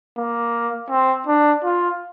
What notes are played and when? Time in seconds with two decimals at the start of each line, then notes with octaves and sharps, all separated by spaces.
0.17 A#3
0.90 C4
1.27 D4
1.64 F4